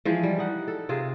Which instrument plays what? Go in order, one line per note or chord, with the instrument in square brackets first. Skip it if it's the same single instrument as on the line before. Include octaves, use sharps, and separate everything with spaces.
[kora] E3 F3 G#3
G3
D#4 F#5
A4
C3 F4 G#4